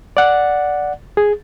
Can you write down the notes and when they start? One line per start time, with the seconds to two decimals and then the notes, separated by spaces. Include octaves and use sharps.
0.17 D5 F#5
1.17 G#4